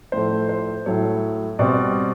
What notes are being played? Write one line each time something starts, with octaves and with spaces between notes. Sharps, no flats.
A2 F3 A3 C5
C5
A2 F#3 A3 C#5
B2 G3 C4 D5